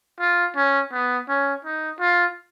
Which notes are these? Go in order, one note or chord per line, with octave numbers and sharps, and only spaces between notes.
F4
C#4
B3
C#4
D#4
F4